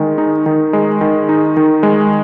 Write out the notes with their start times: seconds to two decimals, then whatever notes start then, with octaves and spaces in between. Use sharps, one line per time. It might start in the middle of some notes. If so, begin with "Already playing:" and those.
Already playing: D#3 G#3
0.18 D#4
0.46 D#3
0.73 G#3
1.01 D#3
1.29 D#4
1.57 D#3
1.83 G#3